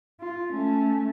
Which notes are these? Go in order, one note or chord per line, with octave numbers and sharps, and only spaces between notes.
F4
A3 C#4